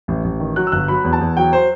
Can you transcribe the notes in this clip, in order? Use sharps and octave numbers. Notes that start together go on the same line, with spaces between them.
A1
A1
D#3
F#3 F#6
E6
G1 F#6
F#3 B5
E2
A5
E2
F#3 G5
C5